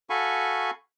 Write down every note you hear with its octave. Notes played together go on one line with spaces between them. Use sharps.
F#4 A4 F5 G#5 B5 C#6